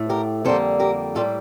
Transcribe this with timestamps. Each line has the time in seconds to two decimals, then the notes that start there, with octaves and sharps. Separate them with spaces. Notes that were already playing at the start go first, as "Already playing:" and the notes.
Already playing: A2 A3
0.09 G4 A#4
0.45 F2 D3 G3 A#3 A4 C5
0.79 G4 A#4
1.15 A2 G3 A#3 F4 A4